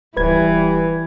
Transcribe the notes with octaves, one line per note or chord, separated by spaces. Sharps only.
D1 E3 G3 B4 G#6